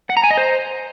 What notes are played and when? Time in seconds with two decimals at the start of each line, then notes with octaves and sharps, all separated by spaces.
0.10 F#5
0.17 A#5
0.24 G#5
0.31 D#5
0.37 C5